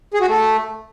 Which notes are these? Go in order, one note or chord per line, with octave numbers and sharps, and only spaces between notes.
G#4
F#4
A3